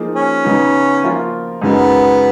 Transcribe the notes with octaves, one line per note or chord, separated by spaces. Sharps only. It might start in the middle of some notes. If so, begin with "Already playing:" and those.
Already playing: F3 A#3 D#4 G#4
C#4
C#3 F#3 B3 D#4 F#4
F3 A#3 F4 A#4
F#2 C#3 G#3 B3 D#4 A#4